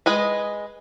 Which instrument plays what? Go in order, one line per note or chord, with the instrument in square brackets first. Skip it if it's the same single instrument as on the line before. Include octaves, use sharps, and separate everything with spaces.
[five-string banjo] G#3 B4 D#5